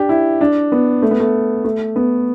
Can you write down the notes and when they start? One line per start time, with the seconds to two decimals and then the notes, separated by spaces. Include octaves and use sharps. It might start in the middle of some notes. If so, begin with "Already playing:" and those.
Already playing: D4 G4
0.09 E4
0.41 D4
0.72 B3
1.02 A3
1.11 B3
1.20 A3
1.65 A3
1.96 B3